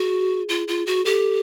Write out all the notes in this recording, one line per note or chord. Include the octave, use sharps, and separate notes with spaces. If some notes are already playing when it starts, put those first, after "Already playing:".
Already playing: F#4 G#4
F4
F4
F#4
G4 A4